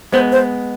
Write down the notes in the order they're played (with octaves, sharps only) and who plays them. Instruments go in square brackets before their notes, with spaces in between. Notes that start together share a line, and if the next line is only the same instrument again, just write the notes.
[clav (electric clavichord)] G#3 B3 [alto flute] C5
[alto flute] C5